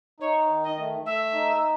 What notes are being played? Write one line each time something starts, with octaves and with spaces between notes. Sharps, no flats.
D#4 C#5
D#3
D#5
A3
A3 E5
D#4